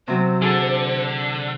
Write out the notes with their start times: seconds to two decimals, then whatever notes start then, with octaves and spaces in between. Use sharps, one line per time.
0.08 C3 F#3 C4 C5
0.42 D3 G#4 A4